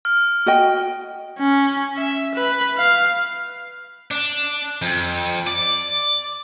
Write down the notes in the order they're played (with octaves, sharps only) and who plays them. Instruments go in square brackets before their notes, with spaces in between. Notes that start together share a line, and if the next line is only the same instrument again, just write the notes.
[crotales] F6
[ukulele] F#4 D#5 G5
[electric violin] C#4
E5
B4
F5
[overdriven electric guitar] D4
F2
D5